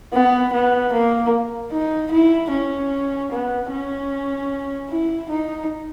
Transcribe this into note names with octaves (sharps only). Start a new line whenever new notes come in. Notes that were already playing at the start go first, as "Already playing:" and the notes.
B3
B3
A#3
D#4
E4
C#4
B3
C#4
E4
D#4